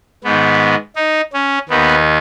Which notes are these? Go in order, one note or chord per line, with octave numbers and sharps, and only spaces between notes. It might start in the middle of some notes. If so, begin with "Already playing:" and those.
G#2 D#3 B3
D#4
C#4
D#2 D#3 B3